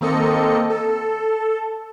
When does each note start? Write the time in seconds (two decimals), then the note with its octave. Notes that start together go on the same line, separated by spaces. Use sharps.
0.01 D#3 A#3 C4 A4 D#5 C#7
0.70 A4